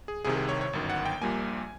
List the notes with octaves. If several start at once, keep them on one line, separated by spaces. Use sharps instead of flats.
G#4
C2 C3 D#3 G#4
G#4
C#5
C#5
G1 F#2 D#3
F#5
G5
A#1 A#2 G3 A#3 G#5